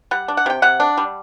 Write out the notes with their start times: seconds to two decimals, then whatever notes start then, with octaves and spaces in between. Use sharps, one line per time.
0.11 G3 F#5
0.28 D4
0.37 F#5
0.46 C3 G5
0.62 C3 F#5
0.80 D4
0.98 G3